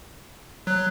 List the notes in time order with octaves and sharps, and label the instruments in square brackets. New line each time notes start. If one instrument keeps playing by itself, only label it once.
[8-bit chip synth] F#3 [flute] F#6